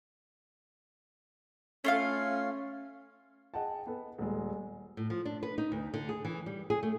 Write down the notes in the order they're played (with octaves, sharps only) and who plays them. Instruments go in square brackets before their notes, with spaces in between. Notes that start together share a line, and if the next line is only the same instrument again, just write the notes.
[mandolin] A3 F4 F5 [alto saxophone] C#4
[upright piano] G#4 D#5 F#5 G5 A5
B3 A4 B4
D#1 G#3
[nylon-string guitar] A2
F3
D4
B4
D#4
D2
D3
G#4
E3
G3
G#4
A3